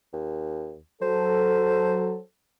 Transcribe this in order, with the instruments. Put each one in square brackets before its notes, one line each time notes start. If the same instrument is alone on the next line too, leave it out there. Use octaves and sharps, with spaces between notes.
[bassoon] D#2
[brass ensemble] F#3 A4 [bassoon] C5